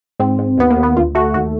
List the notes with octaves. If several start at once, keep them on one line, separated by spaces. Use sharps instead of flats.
G#2 C4
G#2
D#2 B3
A#3
D#2
B3
D2 F4
A3 F#4
D#2 F#4